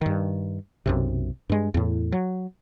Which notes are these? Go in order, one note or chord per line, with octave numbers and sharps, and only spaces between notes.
G2 D#3
B1 F#2 C3
G2 G#3
E2 A2
F#3